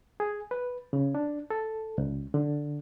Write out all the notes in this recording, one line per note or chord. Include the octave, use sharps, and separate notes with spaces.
G#4
B4
C#3
D4
A4
C#2
D3